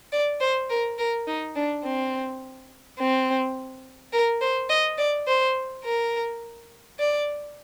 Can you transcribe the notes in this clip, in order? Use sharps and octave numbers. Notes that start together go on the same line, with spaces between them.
D5
C5
A#4
A#4
D#4
D4
C4
C4
A#4
C5
D#5
D5
C5
A#4
D5